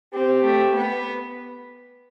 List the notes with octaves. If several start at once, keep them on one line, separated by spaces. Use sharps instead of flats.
C4 G4
A3
B3